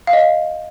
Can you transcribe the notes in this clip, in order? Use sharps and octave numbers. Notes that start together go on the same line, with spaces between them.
F5
D#5
F5